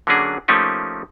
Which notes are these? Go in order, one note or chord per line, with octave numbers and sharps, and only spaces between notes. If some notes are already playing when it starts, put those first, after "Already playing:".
D3 F#3 A#3 C#4 D4 G#4
F3 A3 A#3 C#4 D#4 G4